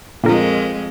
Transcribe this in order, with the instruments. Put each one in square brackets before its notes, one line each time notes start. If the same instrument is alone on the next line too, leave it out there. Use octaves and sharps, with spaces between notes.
[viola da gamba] F2 G#3 [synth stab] A#2 D3 A#4